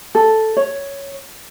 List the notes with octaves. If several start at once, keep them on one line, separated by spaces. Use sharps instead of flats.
A4
C#5